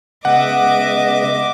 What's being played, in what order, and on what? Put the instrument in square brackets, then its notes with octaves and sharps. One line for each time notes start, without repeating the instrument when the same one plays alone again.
[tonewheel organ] C#3 G#3 B3 [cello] D#5 [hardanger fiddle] E5 D6 [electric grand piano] F#5